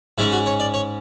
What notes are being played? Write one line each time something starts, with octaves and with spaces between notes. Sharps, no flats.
G#2 G#3 C#4 E4
F#4
C#5
D5
C#5